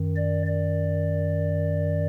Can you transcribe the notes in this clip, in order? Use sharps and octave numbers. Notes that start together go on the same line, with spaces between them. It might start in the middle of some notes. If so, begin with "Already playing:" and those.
Already playing: F#2 D#3
D5
D5